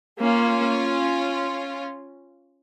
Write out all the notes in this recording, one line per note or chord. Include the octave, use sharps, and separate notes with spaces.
A#3 C#4 F4